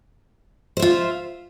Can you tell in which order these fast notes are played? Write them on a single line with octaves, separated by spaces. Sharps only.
C5 E5 F4